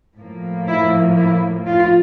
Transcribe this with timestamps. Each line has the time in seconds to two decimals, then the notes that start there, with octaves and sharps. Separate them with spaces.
0.16 A2 F3 A#3
0.67 E4
1.17 E4
1.66 F4